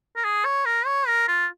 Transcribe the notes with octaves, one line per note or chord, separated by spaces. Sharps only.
A#4
G#4
C#5
A#4
C#5
A#4
F4